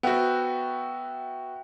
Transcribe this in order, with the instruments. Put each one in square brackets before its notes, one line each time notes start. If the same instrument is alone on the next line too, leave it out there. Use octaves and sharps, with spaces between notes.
[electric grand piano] B3 F#4 [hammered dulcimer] E5 F#5 G5